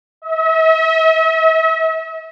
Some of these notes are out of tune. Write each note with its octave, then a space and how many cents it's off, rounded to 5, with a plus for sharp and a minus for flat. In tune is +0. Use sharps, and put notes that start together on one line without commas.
E5 -45